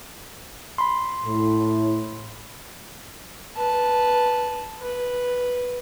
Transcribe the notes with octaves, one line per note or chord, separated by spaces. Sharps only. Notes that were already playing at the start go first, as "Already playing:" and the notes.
B5 C6
A2
B4 A5
B4